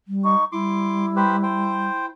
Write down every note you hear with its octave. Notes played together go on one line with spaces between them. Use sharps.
G3
D#4 C#6
G3 E4 C6 D6
G4 B4 C5
C5 G5